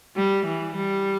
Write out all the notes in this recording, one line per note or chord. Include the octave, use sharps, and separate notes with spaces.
G3
E3
G3